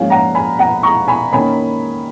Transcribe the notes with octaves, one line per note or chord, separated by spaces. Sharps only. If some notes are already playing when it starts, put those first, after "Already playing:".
Already playing: G#2 F3 A#3 C#4 F5 G#5
F#5 A#5
G#5 B5
F#5 A#5
A#5 C#6
G#5 B5
D#3 A#3 C#4 G#5 B5